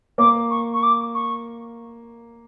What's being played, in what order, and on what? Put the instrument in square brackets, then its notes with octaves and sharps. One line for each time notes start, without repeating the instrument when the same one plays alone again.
[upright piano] A#3 [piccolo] D6
[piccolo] C#6
C#6
D6
C#6